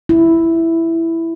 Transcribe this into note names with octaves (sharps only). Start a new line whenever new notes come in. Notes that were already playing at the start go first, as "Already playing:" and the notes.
E4